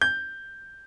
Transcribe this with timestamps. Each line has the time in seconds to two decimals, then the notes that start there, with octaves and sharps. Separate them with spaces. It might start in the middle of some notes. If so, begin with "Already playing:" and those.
0.01 G6